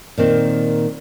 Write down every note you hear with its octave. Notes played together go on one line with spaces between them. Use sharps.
A#2 D#3 C4